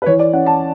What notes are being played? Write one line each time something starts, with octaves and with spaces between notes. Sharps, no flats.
B4
E3 C#5
D5
C#4 F#5
A5